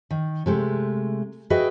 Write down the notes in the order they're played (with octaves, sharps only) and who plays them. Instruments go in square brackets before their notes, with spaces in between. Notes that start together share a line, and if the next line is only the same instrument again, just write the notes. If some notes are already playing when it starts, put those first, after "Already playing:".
[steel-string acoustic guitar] D#3
C3 G#3 A3
F#4 G#4 B4 D#5 E5 G5